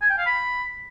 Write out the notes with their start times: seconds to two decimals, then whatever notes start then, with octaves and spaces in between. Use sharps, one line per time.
0.02 G#5
0.10 G5
0.18 F5
0.26 B5